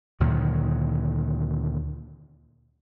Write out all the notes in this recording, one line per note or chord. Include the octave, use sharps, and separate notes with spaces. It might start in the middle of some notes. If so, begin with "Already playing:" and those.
D2 A#2 D#3 F#3